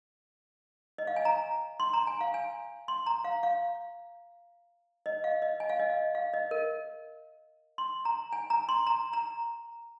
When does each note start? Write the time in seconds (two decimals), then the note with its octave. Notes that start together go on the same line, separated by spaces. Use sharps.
0.98 D#5
1.07 F5
1.16 G#5
1.25 A#5
1.80 C6
1.93 A#5
2.07 G#5
2.21 F5
2.34 G#5
2.88 C6
3.07 A#5
3.24 F5
3.43 F5
5.06 D#5
5.24 F5
5.42 D#5
5.60 G#5
5.70 F5
5.80 D#5
5.90 F5
6.15 F5
6.33 D#5
6.51 A#4
7.78 C6
8.05 A#5
8.33 G#5
8.50 A#5
8.69 C6
8.87 A#5
9.13 A#5